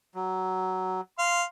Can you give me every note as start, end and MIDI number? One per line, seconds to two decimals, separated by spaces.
0.15 1.01 54
1.19 1.43 77
1.19 1.43 84